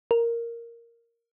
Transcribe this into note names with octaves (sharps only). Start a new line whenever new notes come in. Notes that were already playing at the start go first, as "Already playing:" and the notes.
A#4